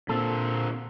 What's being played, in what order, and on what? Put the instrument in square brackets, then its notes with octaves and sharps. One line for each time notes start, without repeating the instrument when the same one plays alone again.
[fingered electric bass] A#2 [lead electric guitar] D3 C4 [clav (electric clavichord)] A4